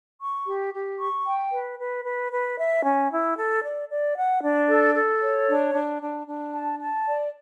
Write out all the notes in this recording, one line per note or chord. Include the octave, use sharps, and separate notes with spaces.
C#6
G4
G4
C#6
G5
B4
B4
B4
B4
E5
C#4
E4
A4
D5
D5
F#5
D4
A4
A4
C#5
D4
D4
D4
D4
A5
A5
D5